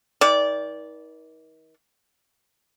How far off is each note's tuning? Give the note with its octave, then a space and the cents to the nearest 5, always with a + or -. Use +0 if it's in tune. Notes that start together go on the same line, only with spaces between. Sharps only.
D#3 +40 D5 -15